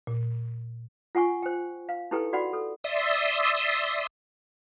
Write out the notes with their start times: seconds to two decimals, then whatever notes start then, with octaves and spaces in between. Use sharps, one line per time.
0.07 A#2
1.15 F4 F#5 G#5 C#6
1.43 C5 G5
1.89 F5
2.11 D#4 E4 G4 A4 B4 G5
2.33 F#4 D5 F#5 B5
2.53 A4
2.84 D5 E5 C6 D#6 E6